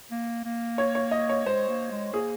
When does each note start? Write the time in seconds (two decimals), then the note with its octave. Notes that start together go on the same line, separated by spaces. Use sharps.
0.11 A#3
0.45 A#3
0.78 C#5
0.95 C#5
1.11 D#5
1.29 C#5
1.46 G#3 C5
1.68 A#3
1.91 G#3
2.13 A#3 G#4